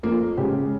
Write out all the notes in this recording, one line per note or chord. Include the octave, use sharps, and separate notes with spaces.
F2 A#3
C#3 G#3 G4